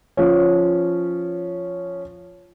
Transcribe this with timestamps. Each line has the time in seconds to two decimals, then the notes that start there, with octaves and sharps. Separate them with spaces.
0.17 F3 C#4